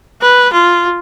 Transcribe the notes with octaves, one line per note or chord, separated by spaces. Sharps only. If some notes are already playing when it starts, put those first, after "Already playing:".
B4
F4